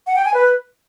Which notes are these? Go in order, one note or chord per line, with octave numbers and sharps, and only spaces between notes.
F#5
G5
G#5
B4